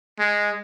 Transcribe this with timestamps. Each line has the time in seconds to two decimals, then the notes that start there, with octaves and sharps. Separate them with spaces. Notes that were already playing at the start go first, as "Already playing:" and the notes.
0.20 G#3